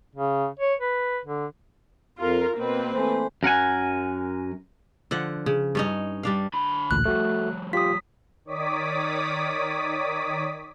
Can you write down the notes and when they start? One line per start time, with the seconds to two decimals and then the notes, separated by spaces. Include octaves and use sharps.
0.15 C#3
0.59 C#5
0.80 B4
1.25 D3
2.19 F2 F4 A#4
2.56 B2 A#3 C4 B4
2.93 E3 A3 C5
3.43 F#2 A#4 F#5 G#5
5.11 D3 F3 F#5
5.46 C#3
5.75 G2 C#4 D#4
6.23 G3 D4 F5
6.54 D3 B5
6.91 A1 D2 A#2 F#6
7.05 F3 G3 A3 F#4
7.73 F4 G4 D#6 B6
8.45 D#3 C#5 D5 D6 D#6 B6